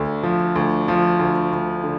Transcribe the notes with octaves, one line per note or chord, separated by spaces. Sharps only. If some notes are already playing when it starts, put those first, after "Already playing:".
Already playing: D2 D3
F3
D2
F3
D2
D2
D3